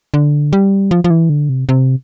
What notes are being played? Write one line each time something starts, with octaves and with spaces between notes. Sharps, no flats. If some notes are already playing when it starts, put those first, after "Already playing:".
D3
G3
F3
F3
E3
D3
C3
C3